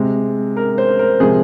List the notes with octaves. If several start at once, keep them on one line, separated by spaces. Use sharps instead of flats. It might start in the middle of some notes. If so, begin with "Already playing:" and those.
Already playing: C3 G#3
A#4
C5
A#4
C3 F3 G#3 G#4